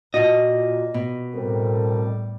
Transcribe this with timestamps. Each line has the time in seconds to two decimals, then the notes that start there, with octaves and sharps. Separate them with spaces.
0.14 A#2 F4 F#4 D#5
0.94 B2
1.35 A2 G3 C4 A4 A#4